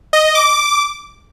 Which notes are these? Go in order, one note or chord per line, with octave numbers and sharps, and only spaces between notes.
D#5
D#5
D6